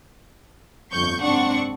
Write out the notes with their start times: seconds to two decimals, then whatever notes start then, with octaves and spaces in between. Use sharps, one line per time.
0.92 G1 F2 A2 C#6 G6
1.23 F#1 G#2 C4 D4 F#5 C#6